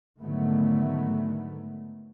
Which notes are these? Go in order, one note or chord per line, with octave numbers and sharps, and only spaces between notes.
G#2 D3 D#3 F#3 A3 B3